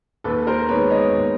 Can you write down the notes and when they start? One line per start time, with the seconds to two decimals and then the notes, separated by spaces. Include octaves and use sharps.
0.24 D#2 A4 B4
0.47 A#4 C5
0.69 D#3 G#3 B3 B4 C#5
0.90 C#5 D#5
1.12 D#2